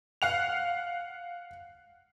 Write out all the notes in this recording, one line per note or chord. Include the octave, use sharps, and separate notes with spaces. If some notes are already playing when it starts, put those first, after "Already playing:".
F5 F#5 F7